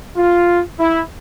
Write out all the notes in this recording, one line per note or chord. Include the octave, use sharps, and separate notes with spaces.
F4
E4